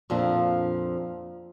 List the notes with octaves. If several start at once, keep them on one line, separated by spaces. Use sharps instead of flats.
F2 A#2 F3 D4